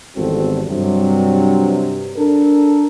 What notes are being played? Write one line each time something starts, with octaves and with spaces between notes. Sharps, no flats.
G#1 E2 G3 C4 F#4 A4
G2 C3 F#3
D4 A4 A#4